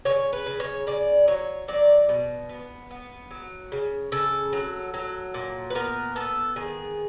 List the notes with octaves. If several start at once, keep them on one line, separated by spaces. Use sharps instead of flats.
C#3 C#5
B4
C#3
C#5
C#3 D5
F#3 C#5
F#3 D5
B2
B3
B3
F#3
C#3
C#3 A4
F#3
F#3
A#2
B4
B3 A#4
B3 A4
D#3 G#4